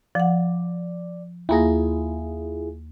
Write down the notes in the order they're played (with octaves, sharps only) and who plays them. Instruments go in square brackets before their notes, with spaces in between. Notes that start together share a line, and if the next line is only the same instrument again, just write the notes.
[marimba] F3 F#5 [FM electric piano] D5
[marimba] D#2 A#3 A#6 [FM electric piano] E4 F4 G#4